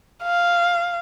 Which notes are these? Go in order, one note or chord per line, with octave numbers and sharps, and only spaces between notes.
F5